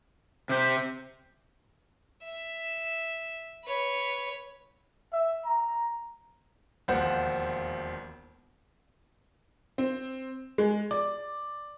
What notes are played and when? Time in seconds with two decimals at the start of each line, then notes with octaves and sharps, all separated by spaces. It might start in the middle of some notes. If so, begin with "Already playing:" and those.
0.49 C3 G4 C5
2.23 E5
3.63 B4 C#5
5.13 E5
5.45 A#5
6.88 E1 D#2 F3 C5 F#5
9.78 C4
10.58 G#3
10.91 D5